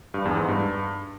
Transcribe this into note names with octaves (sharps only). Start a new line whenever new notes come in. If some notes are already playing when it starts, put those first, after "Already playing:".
G2
E2
G#2
G2